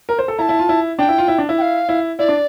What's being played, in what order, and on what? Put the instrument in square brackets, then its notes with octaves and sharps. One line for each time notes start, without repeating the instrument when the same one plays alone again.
[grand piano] A#4
C5
A4
[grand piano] E4 [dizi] A#5
[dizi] A5
[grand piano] E4
F4
E4
[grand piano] D4 [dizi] G5
[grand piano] E4
F4
E4
D4
E4
[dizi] G5
F5
[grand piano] E4
[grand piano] E4 [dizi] D5
[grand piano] D4